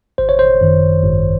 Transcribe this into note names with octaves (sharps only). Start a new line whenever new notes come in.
G#1 C5
C#5
C5
F#2 D#3
G#1